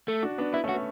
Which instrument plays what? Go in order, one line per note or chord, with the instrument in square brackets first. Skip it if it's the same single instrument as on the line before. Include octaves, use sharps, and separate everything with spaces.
[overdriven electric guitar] A3
[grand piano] D4 F#4
B3 D4
[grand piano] B3 [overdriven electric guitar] E4
[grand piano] A3 C#4
[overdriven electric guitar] F#4
[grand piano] B3